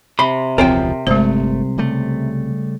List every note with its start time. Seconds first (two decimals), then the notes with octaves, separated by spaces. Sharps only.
0.19 C3 B5 C6
0.58 E1 C#2 F3 C4 A#4 C5 C#5 G5
1.07 G1 C2 G#3 A3 C5
1.78 C#3 G3 A3